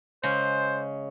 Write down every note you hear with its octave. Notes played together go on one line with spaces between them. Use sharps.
C#3 G#3 C5